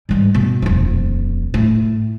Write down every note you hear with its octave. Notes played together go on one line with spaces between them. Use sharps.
G#2 G3
B2
D#1 F2
A2